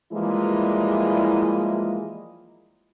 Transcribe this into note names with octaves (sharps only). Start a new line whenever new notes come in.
E3 F3 G3 G#3 A#3 E4